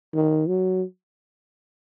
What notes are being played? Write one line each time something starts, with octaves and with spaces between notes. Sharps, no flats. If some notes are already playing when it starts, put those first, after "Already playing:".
D#3
F#3